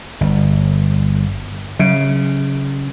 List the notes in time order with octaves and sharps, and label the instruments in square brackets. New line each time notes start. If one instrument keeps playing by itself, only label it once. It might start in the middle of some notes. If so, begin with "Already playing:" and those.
[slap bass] G1
[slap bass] C#3 [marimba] F#3